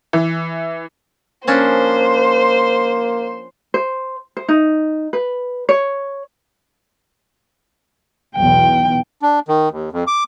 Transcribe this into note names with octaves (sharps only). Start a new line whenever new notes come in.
E3
F3 A#3 C#4 D4 C5
C5
C5
D#4
B4
C#5
B1 E2 G5
D4
D#3
D#2
F2
D6